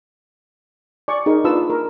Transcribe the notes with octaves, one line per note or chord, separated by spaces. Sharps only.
D5 G#5 C#6
D#4 G#4 A#4
D4 F4 B4 A5 D#6 E6
A#4